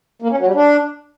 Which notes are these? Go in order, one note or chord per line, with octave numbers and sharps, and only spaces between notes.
A#3
C#4
F#3
G3
D4